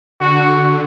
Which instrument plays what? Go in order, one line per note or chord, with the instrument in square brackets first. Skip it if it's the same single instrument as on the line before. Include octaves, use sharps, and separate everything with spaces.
[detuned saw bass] D3 [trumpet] F#4